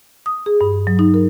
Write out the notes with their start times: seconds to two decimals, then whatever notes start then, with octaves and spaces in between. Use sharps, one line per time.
0.26 D#6
0.46 G#4
0.61 G2
0.87 F#3
0.99 D#4
1.14 A#4